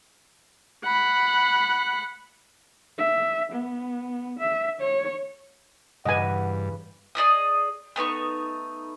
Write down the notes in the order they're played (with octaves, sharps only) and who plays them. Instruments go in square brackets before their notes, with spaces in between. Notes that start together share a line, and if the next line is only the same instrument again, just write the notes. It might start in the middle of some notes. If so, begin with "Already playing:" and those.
[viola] F#5 B5
[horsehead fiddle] E5
B3
E5
C#5
[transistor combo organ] G2 [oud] C#3 E3 B4 [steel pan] D#5 G#5 [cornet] F#5
[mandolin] G#4 D5 D#5 D#6
A3 B3 D#4 C#6